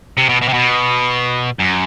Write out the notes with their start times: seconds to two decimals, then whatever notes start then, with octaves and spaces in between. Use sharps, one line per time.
0.17 C3
0.29 B2
0.42 B2
0.49 C3
0.54 B2
1.59 F#2